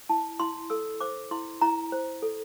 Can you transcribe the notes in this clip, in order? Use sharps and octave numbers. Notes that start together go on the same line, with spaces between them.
E4 A5
E4 C6
A4 E6
C5 D6
E4 C6
E4 A#5
C5
A4